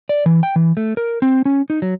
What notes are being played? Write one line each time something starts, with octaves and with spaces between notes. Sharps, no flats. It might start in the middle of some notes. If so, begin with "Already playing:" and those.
D5
E3
G5
E3
A3
A#4
C4
C#4
D#4
F#3